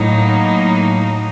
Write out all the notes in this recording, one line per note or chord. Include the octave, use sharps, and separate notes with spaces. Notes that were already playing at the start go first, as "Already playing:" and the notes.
Already playing: A2 F#3 A#3 D#4